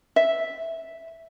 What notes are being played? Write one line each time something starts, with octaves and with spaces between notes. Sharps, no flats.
E5